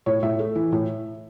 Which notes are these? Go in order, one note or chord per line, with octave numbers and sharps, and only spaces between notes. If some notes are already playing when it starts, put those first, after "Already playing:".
A2 C#5
A2 E5
A3
E3
A2